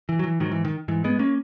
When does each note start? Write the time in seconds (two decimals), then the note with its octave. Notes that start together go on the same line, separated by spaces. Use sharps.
0.09 E3
0.19 F#3
0.24 E3
0.40 G#2 D#3 F#3
0.52 E3
0.65 D#3
0.88 G#2 E3
1.04 G#3 B3
1.19 A#3 C#4